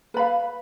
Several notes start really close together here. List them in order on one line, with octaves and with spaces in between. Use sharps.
B4 B5 F5